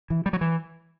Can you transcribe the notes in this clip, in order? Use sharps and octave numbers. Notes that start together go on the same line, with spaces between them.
E3
G3
F#3
E3